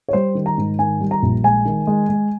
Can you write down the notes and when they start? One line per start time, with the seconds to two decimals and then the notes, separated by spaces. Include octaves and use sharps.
0.08 C#5
0.13 G3 C5
0.35 D#3
0.46 A#5
0.58 G#2
0.79 D#3 G#5
1.00 G3
1.11 A#5
1.23 A#1
1.44 G#3 G#5
1.65 D#3
1.87 G#3
2.09 G#3